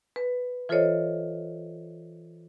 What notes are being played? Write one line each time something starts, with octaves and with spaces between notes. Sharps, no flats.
B4
E3 F4 A4 C5 C#5 D#5